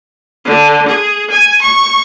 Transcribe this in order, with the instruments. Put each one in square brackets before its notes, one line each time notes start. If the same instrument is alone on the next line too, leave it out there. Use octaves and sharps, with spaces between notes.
[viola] D3
G#4
G#5
C#6